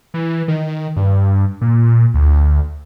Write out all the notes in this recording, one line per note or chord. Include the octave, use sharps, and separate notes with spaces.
E3
D#3
G2
A#2
D2